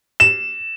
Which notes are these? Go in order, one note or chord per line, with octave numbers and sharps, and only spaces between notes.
E7